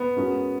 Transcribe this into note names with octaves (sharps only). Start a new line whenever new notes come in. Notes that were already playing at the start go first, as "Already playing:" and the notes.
Already playing: B3
G#3 C#4 F#4 A#4